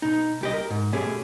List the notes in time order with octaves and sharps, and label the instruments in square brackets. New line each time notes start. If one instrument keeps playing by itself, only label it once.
[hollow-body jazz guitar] B2 D#4
C2 G4 D#5
A#4
G#2
B2 A3 C#4 G4 G#4